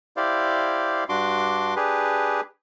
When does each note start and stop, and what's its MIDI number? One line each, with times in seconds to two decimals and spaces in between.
0.17 1.04 64
0.17 1.04 67
0.17 1.04 72
0.17 1.04 74
0.17 1.04 77
1.09 1.75 43
1.09 1.75 62
1.09 1.75 66
1.09 1.75 84
1.09 1.75 86
1.76 2.41 62
1.76 2.41 67
1.76 2.41 68
1.76 2.41 71